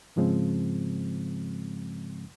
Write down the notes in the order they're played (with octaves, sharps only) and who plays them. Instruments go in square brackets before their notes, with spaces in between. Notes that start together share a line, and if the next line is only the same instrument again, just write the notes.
[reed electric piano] G#2 C#3 F3 G#3 C4